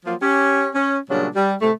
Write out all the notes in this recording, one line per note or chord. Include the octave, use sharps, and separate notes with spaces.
F3 F#3 A#3 F4
C#4 G4
C#4
A#2 C#3 F#3 G3 D4
G3
A2 C3 A3